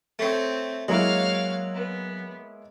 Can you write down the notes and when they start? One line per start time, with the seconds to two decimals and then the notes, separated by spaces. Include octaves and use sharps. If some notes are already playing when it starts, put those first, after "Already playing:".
0.19 A3 C4 C#5
0.88 F#3 G#3 A#3 E4 C#5 F5
1.75 B3